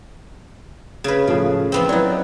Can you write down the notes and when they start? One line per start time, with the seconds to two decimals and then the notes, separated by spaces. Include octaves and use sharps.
1.04 C#3 B4
1.27 A2 C#3 F3 A3
1.72 F3 B3 C4
1.89 F#3 D#4 E4 B4 D5